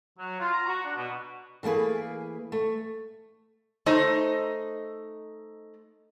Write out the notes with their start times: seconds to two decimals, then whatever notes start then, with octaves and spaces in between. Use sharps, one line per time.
0.18 F#3
0.40 F4
0.53 A#5
0.67 F#4
0.85 D4
0.97 B2
1.63 E3 A3 A#3 G#4 B4
2.52 A3
3.86 A3 D#4 C5 D#5